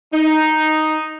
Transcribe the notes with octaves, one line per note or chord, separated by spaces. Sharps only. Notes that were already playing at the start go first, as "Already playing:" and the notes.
D#4